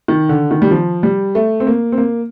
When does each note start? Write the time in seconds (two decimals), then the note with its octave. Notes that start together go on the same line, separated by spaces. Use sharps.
0.08 D#3
0.29 D3
0.51 D#3
0.62 G3
0.71 F3
1.03 G3
1.35 A3
1.60 C4
1.67 A#3
1.92 C4
1.98 A#3